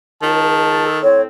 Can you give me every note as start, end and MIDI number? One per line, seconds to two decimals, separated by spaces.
0.22 0.84 37
0.22 1.00 51
0.22 0.84 81
0.87 0.97 69
1.02 1.25 45
1.02 1.25 60
1.02 1.21 73